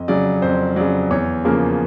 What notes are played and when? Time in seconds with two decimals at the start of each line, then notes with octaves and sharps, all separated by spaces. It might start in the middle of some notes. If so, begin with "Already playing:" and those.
Already playing: F2 D#5
0.08 C#3 F#3 D5
0.42 F2 C5
0.76 C#3 F#3 D5
1.10 E2 C#5
1.45 C#3 F3 A#3